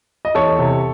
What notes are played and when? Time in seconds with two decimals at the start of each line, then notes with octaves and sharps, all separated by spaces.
0.25 D#5
0.35 E2 A4 C#5
0.59 C3